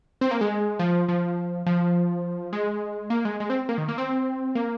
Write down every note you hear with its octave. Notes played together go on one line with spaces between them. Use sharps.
C4
A#3
G#3
F3
F3
F3
G#3
A#3
G#3
G#3
C4
A#3
D#3
A#3
C4
A#3